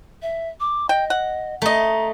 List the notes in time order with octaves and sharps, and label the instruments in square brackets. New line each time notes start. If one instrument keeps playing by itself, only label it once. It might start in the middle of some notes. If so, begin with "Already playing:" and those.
[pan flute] E5
D6
[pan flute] D#5 [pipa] G5
[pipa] F#5
[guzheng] A3 D#5 [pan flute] A#5